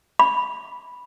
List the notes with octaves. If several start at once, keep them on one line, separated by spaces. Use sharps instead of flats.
B5